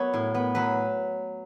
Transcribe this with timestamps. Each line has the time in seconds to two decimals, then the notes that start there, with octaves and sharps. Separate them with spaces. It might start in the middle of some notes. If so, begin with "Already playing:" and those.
Already playing: F#3 B3 C#5
0.14 A2
0.35 B3
0.55 F#3 B4